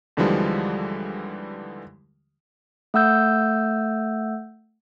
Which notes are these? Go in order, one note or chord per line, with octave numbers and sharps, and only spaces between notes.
D#2 D3 E3 F3 G3 G#3
A3 F#5 E6 G6